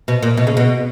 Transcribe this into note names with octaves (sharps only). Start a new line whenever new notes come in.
B2
A#2
B2
C#3
B2